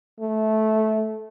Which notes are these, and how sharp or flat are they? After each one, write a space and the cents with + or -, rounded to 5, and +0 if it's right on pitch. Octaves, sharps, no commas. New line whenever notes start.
A3 -15